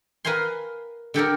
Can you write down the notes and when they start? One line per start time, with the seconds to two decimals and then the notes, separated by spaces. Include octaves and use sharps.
0.25 A#4 B4 F5 G#5 C6
1.14 D3 G4 A4 A#4